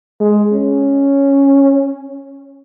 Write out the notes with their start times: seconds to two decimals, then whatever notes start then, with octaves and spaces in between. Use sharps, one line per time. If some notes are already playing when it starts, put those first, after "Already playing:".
0.20 G#3
0.52 C#4